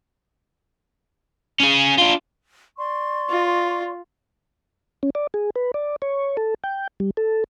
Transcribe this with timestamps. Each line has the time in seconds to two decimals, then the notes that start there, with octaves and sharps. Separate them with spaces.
1.60 C#4 G#4
1.98 D4 F4
2.78 D5 C6 C#6
3.30 F4
5.03 C#4
5.15 D5
5.34 G#4
5.55 B4
5.74 D5
6.02 C#5
6.37 A4
6.64 G5
7.00 G3
7.17 A4